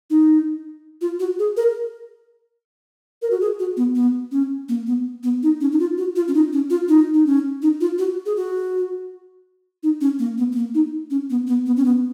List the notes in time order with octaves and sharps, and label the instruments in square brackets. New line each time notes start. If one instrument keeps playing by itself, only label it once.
[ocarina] D#4
F4
F#4
G#4
A#4
A#4
F#4
G#4
F#4
B3
B3
C#4
A#3
B3
B3
D#4
C#4
D#4
F4
F#4
F4
C#4
D#4
C#4
F4
D#4
D#4
C#4
D#4
F4
F#4
G#4
F#4
D#4
C#4
A#3
B3
B3
A#3
D#4
C#4
B3
B3
B3
C#4
B3